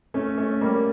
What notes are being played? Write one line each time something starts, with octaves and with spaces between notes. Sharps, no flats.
A3 C#4
A3 C#4
G3 A#3